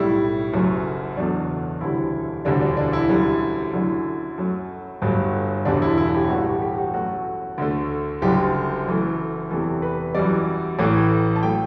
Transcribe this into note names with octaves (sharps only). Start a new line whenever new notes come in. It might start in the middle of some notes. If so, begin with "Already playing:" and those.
Already playing: B1 A2 G3 E4
F#1 F#2 F#3 A3
F#1 E2 B2 F#3 A3 D4
E1 D2 D3 G3 E4
E1 D2 D3 G3 D4
D4
D4
E4
F#2 D3 G3
F#2 D3 A3 E4
F#2 F#3 A3
G1 G2 F#3 A3
E1 E2 D3 G3 D4
E4
E4
G4
A1 A2 G3 F#4
G4
G4
F#4
F#2 F#3 A3 F#4
D2 D3 A3
F#1 F#2 D3 G3 G4
F#2 E3 A3
E2 C3 E3 A3 A4
B4
F#2 E3 G3 D5
A1 A2 E3 A3
A5
F#3 A3 G5